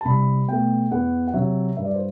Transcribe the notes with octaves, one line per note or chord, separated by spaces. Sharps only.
A5
C2 B5
B2 A3 G5
E2 F#5
F#5
C3 F#3 E5
G2 E5
D5
C5